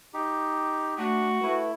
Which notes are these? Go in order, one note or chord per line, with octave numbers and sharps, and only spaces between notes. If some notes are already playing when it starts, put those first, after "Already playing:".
D#4 G4
A3 D4 F#4
A3 E4 B4